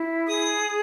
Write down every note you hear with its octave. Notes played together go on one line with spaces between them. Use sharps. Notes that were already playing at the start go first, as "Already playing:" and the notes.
Already playing: E4
G#4 D#6